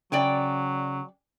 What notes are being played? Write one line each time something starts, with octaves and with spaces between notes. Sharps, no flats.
C#3 F#3 D5 G5 G#5